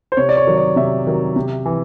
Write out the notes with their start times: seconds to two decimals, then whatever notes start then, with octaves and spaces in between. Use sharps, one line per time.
0.12 C5
0.17 C3 C#5
0.29 D5
0.37 C#5
0.47 D#3 F#3
0.57 D5
0.76 C3 E5
1.07 D#3 F#3
1.36 C3
1.66 E3